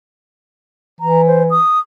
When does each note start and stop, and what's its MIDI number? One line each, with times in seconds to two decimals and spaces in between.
1.01 1.58 52
1.01 1.22 82
1.27 1.43 72
1.50 1.79 87